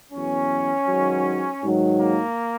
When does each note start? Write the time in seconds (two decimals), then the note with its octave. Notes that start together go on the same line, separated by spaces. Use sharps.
0.12 E2 B2 F#3 C#4
0.87 G#2 D#3 F#3
1.62 G#2 D#3 F#3
1.99 A#3